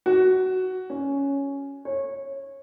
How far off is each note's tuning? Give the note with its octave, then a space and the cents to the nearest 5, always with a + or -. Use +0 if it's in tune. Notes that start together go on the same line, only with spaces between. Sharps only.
F#4 +10
C#4 +5
C#5 -20